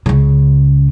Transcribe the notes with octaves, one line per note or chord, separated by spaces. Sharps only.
C#2 C#3